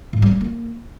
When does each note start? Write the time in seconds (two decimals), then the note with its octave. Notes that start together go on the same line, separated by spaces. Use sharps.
0.13 G#2
0.22 G3
0.31 C4
0.41 A#3